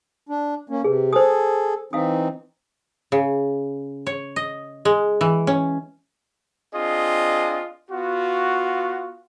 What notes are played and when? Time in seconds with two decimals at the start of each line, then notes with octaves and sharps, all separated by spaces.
0.29 D4
0.70 A#3 C#4
0.84 C3 G#4 B4
1.13 G#4 A4 C5 D#6
1.93 E3 C4 D#4 F5 D#6
3.12 C#3
4.07 C#5
4.36 D#5
4.85 G#3
5.21 E3
5.47 C#4
6.74 C4 D4 F4 G#4 D#5
7.90 B3 F4 F#4